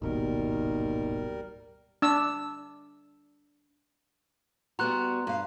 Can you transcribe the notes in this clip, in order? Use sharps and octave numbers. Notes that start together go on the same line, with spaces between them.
D1 G#1 D#2 B2 G3 A#4
D4 E6
G3 B3 F#4 A#5 C6 F#6
G2 F5